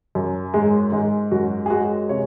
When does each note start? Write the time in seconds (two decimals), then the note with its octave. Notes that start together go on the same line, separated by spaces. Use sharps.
0.15 F#2
0.54 G#2 G#3
0.92 G#2 G#3
1.31 F#2 F#4
1.66 G#4
1.70 G#3 F#4
2.09 C3 C#5